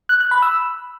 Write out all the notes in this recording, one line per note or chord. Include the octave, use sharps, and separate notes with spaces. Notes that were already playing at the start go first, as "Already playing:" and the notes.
F#6
F#6
B5
E6